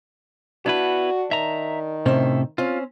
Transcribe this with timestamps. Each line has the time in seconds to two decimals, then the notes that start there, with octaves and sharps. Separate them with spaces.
0.66 B3 D4 E4 F#4 B4
1.31 D#3 E5 A#5
2.06 A2 C3 C#4 C5 E5
2.58 C4 C#4 F4